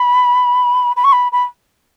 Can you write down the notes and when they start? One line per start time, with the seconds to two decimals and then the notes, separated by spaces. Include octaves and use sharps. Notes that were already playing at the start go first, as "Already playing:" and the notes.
Already playing: B5
0.96 B5
1.04 C#6
1.12 B5
1.32 B5